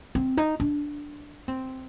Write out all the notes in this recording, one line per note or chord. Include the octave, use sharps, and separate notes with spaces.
C4
D#4
D4
C4